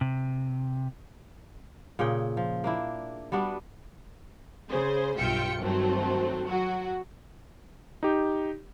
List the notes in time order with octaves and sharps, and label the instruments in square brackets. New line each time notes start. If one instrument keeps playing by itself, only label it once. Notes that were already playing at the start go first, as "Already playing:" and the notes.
[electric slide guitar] C3
[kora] A#2 C#3 G#4 G5
F3
A#3 D4 E4
G3 B3 D4 F#4
[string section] C#3 G#4 C5
B1 G2 F4 E5 G5 C#7
G2 D#3 F#3 A3 C4
F#3 F#4
[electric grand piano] D#4 G4